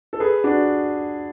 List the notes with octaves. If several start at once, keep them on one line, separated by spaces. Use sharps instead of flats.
A4
G#4 B4
D4 F#4